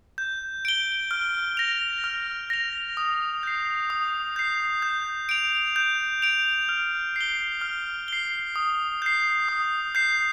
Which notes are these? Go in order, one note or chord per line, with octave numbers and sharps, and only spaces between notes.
G6
D7 G7
F6
A#6 F7
F6
A#6 F7
D#6
G6 C7
D#6
G6 C7
G6
D7 F7
G6
D7 F7
F6
C7 G7
F6
C7 G7
D#6
G6 C7
D#6
G6 C7